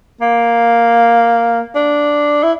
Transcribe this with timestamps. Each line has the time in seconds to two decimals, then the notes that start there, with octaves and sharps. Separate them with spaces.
0.21 A#3
1.76 D4
2.43 E4